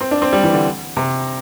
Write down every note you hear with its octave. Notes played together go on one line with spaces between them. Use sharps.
C4
D4
C4
G3
E3
D3
C3